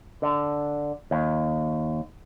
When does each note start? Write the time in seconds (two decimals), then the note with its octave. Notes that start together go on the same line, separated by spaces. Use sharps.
0.22 D3
1.11 D#2